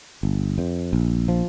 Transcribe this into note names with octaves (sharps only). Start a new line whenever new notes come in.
G1
F2
A#1
F3